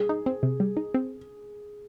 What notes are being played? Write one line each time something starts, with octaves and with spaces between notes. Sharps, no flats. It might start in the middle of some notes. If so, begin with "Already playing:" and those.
Already playing: G3 G#4
D#4
C4
C3
G3
D#4
C4